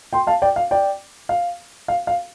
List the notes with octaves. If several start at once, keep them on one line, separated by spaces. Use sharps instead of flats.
G5 C6
F5 A5
D5 G5
F5
D5 G5
F5
F5
F5